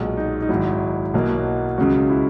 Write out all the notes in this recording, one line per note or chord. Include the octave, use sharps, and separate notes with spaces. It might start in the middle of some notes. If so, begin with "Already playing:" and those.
Already playing: B1 A#2 G#3 F#4
D#4
D#4
G#1 G#2 F#3 E4
B1 B2 F#3 A#3
C#2 C#3 F#3 F#4
E4